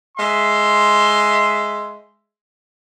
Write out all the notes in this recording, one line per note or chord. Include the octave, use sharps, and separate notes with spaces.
G#3 E5 C6